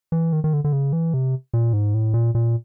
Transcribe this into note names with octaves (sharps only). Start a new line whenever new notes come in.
E3
D#3
D#3
D3
D3
C#3
E3
C3
A#2
G#2
A2
A#2
A#2